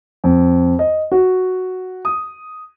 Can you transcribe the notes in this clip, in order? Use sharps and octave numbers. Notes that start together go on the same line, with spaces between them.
F2
D#5
F#4
D#6